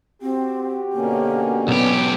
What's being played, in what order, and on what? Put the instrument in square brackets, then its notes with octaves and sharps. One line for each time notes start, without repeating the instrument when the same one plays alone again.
[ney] C4 [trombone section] F#4 G4
[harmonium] B2 D3 C#4 [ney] A#3
[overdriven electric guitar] B1 G4 [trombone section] B3